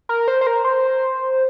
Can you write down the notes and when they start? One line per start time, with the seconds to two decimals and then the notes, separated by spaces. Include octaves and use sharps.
0.09 A#4
0.28 C5
0.41 C5
0.47 A#4
0.65 C5